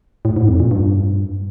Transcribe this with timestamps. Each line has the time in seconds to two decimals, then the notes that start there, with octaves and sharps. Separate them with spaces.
0.25 A2
0.36 G#2
0.48 F2
0.60 A#2
0.71 G2